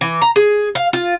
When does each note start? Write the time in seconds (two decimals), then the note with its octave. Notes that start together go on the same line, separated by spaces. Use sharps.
0.01 E3
0.22 A#5
0.36 G#4
0.75 F5
0.93 F4